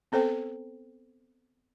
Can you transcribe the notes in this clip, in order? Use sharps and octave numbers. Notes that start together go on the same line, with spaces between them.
B3 C4 A4 C5 G5